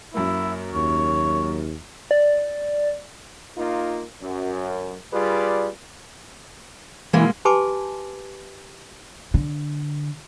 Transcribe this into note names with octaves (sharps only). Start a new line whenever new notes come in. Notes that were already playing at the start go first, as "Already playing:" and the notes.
F#2 A#3 E4
D#2 C#5
D5
A#3 D#4 F4
F#2
G3 F4 G#4 B4 D5
B2 E3 G#3 A#3
G4 B4 G#5 A5 C6 D6
D3